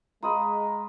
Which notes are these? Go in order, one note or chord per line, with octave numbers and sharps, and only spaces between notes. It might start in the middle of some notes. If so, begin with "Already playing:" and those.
G#3 F4 D#5 A#5 B5